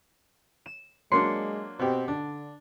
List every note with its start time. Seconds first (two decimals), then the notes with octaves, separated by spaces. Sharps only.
0.66 E7
1.12 F#3 G#3 A#3 D4 C6 C#7
1.79 B2 C4 G4
2.08 D3 D4